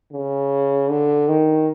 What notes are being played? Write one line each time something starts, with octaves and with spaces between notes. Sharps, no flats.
C#3
D3
D#3